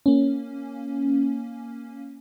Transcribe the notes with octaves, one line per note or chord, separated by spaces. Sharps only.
A#3 C#4